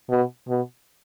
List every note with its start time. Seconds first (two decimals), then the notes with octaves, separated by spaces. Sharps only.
0.10 B2
0.48 B2